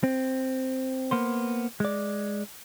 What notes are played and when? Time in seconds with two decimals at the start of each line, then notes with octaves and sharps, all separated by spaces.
0.04 C4
1.11 A#3 B3 C5
1.80 G#3 D5